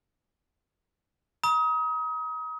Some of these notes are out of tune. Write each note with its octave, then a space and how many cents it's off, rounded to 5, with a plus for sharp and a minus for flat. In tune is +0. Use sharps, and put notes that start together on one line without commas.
A#5 +45 D#6 +30